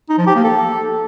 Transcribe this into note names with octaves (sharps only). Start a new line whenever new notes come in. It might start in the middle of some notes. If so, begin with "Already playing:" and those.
D#4
F3
G4
A#3
A4